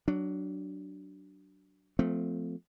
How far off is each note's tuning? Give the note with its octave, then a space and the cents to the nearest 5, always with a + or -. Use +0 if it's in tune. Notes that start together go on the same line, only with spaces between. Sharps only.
F#3 +20 D4 +0
F3 +5 A3 +0 C4 -30